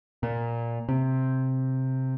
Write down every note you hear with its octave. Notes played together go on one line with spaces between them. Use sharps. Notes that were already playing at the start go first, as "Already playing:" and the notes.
A#2
C3